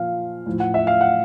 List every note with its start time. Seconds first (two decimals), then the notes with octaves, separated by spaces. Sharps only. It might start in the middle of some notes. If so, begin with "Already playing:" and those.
Already playing: A#2 F3 F5
0.46 A2 F3
0.60 F#5
0.74 E5
0.87 F5
1.01 F#5